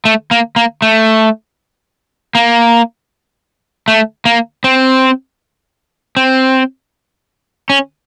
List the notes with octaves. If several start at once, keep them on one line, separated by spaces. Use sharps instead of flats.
A3
A#3
A#3
A3
A#3
A3
A#3
C4
C4
C#4